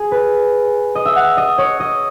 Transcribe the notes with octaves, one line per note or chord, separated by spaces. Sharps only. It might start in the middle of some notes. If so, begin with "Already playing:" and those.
Already playing: G#4
B4
D#5
E5
F#5
D#5
C#5
D#5